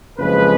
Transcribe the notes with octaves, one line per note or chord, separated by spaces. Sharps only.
F#1 F2 C#3 F3 G#3 B4